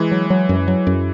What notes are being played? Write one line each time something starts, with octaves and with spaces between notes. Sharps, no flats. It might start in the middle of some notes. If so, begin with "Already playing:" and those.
Already playing: E3 G#3
F#3
F#3
F#2
F#3
F#2